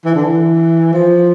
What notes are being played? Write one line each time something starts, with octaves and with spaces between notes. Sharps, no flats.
E3
D3
E3
F3